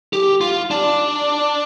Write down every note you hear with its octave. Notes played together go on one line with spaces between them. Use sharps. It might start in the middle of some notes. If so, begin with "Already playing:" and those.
G4
F4
D4